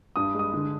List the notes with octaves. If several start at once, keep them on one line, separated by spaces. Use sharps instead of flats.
G2 D#6
G#3 D#6
D3